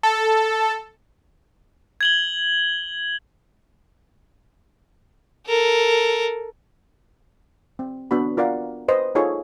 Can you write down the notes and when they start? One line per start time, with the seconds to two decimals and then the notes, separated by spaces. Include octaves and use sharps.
0.03 A4
2.01 G#6 F#7 G7
5.47 A4 A#4
7.79 C4
8.11 B3 D4 F#4 B5
8.37 F4 A#4 D5 F5 F#5
8.88 B4 C5 D#5
9.15 D#4 F4 G#4 A4 C#5